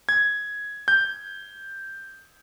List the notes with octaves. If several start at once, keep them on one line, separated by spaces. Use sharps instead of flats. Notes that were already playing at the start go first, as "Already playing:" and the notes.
G#6
G6